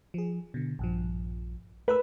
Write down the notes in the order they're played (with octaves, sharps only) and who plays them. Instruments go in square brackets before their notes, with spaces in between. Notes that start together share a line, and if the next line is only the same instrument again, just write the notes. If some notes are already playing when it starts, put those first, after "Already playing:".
[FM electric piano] F3 G#4
B2 D3
A#1 G2 F3
[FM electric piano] A3 A#4 E6 [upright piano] B4